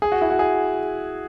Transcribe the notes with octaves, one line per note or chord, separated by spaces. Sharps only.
G#4
F#4
E4
F#4
G#4